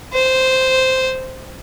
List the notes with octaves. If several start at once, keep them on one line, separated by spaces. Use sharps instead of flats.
C5